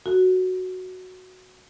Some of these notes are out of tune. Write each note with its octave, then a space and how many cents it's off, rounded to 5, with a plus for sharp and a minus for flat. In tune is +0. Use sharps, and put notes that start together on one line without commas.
F#4 +0 A4 +35